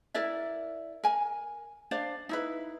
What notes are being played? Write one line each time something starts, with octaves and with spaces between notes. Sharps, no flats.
E4 A#4 D5 E5
A#4 G#5
D4 C5 D5 F5
D#4 E4 B4